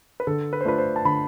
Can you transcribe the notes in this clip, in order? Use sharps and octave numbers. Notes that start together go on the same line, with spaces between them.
B4
D3 A4
B4
C5
A3 D4 F4 B4
C5
A5
D3 B5